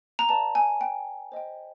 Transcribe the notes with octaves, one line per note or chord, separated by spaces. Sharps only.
A#5
B4 D5 F5 A5
G#5
G5
C5 D#5 G5